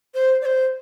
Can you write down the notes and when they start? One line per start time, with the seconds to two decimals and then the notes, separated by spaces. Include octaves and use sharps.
0.14 C5
0.41 D5
0.46 C5